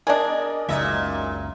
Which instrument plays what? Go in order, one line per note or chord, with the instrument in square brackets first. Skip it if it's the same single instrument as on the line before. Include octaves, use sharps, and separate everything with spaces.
[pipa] D4 G#4 [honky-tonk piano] A#4 D5 D#5
[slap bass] F#1 C#2 C#3 [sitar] A#2 D#4 E5